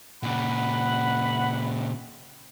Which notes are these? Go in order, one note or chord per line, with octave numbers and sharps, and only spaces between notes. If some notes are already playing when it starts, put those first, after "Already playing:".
A#2 C#3 F#5 B5